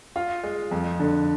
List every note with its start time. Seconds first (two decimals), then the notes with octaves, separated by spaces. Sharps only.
0.16 F4
0.43 G#3
0.71 F2
1.00 D3